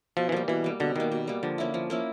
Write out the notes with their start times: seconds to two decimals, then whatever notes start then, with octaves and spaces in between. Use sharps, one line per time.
0.17 B2 F3
0.29 E3
0.32 F3 G3 A#3
0.48 B2 E3
0.64 G3 A#3
0.80 B2 D3
0.95 D#3 G3 A#3
1.12 B2
1.27 G3 A#3
1.43 D3 F3
1.58 A#3 C#4 E4
1.74 F3
1.90 A#3 C#4 E4